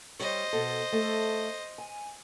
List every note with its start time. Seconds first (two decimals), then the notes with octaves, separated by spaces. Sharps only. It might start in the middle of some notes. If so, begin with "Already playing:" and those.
0.20 G3 C5 C#5 D#5
0.53 B2 A4
0.92 A3 A4
1.78 G#5